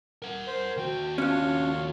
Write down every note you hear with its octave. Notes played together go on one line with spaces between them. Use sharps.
A#4 F#5
C5
D#2 F#4 G5
C#4 D4 F4 C#5